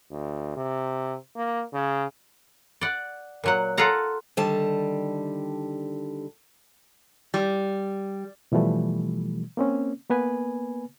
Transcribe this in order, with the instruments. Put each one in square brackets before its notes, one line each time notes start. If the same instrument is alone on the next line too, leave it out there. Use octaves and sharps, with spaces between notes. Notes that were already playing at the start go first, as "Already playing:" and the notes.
[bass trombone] D2
C3
A#3
C#3
[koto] D5 F#5
A#2 F#3 F#5
F4 A4 F5 F#5 A#5
[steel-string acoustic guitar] D3 D#3 G3 A5
[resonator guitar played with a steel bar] G3
[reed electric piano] B2 E3 F3 G3 A3
A#3 C4 C#4
A#3 B3 B4 G#5